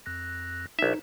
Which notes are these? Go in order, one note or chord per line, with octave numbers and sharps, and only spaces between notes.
F2 F#6 A#6
A#1 D#4 E5